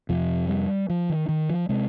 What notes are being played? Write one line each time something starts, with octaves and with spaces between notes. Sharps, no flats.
F2 C3 F3
G3
F3
D#3
D#3
F3
C3 G#3